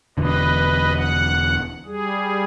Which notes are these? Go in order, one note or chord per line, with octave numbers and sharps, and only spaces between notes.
E1 E2 D3 B4 D#5
F#5
G3 G#4